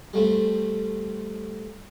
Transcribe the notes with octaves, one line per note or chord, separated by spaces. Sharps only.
G3 A3 C4